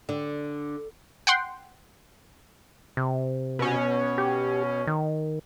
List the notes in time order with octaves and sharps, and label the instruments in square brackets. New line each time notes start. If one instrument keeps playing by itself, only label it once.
[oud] D3
[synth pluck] F#5 G5 C6
[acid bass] C3
[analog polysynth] B2 C#4
[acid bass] G4
D#3